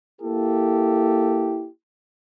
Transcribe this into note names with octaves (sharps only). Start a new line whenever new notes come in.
A#3 E4 G4 A4